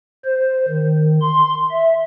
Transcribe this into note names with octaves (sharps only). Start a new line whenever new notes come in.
C5
D#3
C6
E5